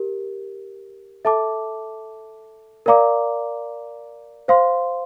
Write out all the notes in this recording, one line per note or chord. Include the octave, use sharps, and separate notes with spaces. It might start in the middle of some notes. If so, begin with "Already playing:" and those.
Already playing: G4 A#4
A4 E5 A5 D6
A#4 D5 F5 A#5 D6
C5 F5 C6